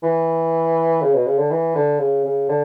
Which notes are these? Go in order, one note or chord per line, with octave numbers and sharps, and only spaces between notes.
E3
C#3
B2
C#3
D3
E3
D3
C#3
C#3
D3